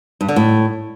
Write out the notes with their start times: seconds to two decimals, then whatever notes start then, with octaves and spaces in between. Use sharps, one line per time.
0.21 G2
0.28 D3
0.36 A2